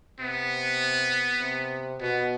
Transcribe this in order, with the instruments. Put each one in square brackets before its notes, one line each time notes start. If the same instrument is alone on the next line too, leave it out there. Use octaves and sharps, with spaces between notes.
[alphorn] C3 [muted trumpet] B3
[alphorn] C3
[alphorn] B2 [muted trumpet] B3